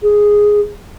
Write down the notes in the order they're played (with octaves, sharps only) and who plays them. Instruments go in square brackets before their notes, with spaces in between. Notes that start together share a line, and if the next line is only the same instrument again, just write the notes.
[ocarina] G#4